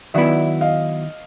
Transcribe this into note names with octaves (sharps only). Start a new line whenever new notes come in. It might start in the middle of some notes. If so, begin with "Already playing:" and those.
D#3 F#3 B3 E4 D5 E5
D#5 F5